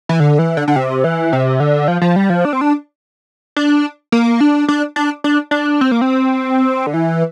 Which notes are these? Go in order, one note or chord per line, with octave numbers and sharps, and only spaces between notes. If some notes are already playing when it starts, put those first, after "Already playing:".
E3
D3
E3
D3
D3
C3
E3
C3
D3
F3
F3
G3
F3
D4
C4
D4
D4
A#3
D4
D4
D4
D4
D4
C4
A#3
C4
D3
E3